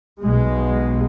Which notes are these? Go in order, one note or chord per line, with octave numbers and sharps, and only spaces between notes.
B1 B2 G#3